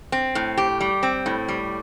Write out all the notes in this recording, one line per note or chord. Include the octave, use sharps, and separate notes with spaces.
C4
A2
G4
G3
C4
A2
G3